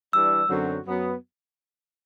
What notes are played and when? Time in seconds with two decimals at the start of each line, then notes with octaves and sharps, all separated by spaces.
0.13 E3 G3 D4 E6
0.49 F#2 D3 F#3 C4 F#4
0.85 F#2 F#3 B3